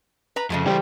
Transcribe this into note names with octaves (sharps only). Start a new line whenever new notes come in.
B4 A#5
F2 C#3 G#3 A3
E3 G3 C5 G5